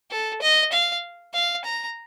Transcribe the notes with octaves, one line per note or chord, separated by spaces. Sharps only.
A4
D#5
F5
F5
A#5